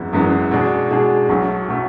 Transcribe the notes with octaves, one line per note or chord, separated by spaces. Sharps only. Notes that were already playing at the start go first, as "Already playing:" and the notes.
Already playing: G#1 F#2 E3 G#3 B3
G#1 F#2 E3 G#3 B3
B2 G#3 D4 G#4
B2 G#3 D4 G#4
B1 B2 F#3 A3
B2 F#3 A3